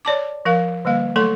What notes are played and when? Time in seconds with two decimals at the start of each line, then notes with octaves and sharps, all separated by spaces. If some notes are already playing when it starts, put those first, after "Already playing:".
0.05 C#5 D5 A5 D6
0.45 F3 A#4 F5
0.85 D3 G3 A#3 F5
1.16 F#3 A3 A4 C6